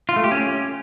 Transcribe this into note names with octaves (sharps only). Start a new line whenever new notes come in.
F4
A3
G4
C#4